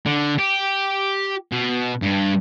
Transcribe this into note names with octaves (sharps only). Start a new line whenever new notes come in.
D3
G4
B2
G2